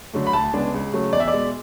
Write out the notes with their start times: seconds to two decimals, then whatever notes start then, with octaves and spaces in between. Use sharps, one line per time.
0.13 D3 F#3 A3
0.27 B5
0.33 D2 A5
0.54 C#3 G#3 B3 D4
0.74 C#2
0.94 C#3 F#3 A3
1.13 E2 D5
1.20 E5
1.28 D5
1.33 B2 G#3